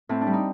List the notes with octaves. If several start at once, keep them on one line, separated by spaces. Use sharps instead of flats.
A2 C4
D4
G3
D#4